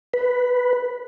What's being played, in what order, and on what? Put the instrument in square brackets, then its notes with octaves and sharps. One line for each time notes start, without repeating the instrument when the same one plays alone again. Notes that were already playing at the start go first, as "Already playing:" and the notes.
[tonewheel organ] B4